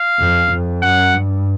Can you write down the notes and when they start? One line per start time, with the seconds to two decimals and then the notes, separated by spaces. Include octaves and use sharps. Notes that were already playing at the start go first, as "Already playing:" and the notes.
Already playing: F5
0.20 F2
0.52 F2
0.83 F#2 F#5
1.14 G2